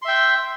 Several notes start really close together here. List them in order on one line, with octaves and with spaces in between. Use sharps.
C6 E5 G5